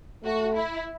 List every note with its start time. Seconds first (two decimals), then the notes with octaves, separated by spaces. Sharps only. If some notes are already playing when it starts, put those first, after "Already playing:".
0.24 A3 F#4
0.55 E4